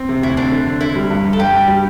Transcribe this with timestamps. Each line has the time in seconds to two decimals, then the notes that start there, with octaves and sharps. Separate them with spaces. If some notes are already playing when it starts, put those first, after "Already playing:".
Already playing: C4
0.09 C3
0.23 D2 E4
0.37 C4 D4
0.52 D3
0.66 D3
0.81 D3 E4
0.96 G3
1.11 G2
1.25 G2
1.33 A4
1.39 G2 G4
1.53 G2
1.68 G3